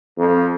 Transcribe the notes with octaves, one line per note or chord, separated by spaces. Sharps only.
F2